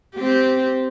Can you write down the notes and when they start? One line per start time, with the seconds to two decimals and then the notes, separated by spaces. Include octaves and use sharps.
0.16 C4 G4